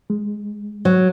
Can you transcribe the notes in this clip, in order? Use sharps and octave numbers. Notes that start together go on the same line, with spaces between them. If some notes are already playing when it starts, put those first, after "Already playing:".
G#3
F#3